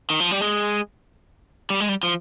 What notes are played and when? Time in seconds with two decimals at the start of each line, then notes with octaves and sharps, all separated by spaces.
0.10 D#3
0.20 F3
0.31 G3
0.41 G#3
1.70 G3
1.80 G#3
1.89 G3
2.03 F3